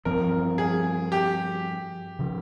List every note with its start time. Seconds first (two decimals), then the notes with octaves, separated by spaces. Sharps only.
0.05 G2 F3 C4 A#4
0.58 G#4
1.12 G4
2.19 C#3 F3